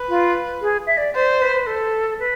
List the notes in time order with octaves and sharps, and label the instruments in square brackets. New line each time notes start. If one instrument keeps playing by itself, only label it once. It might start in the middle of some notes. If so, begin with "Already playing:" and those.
Already playing: [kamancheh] B4
[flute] F4
G#4
E5
D5
[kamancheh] C5 [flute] D5
[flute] B4
A4
B4